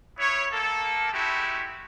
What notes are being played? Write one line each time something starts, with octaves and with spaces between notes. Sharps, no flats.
B3 E4 C#5
A#3 A4
G#3 A3 E4 F#4 G4